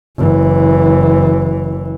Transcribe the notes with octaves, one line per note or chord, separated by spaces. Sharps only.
F#1 E3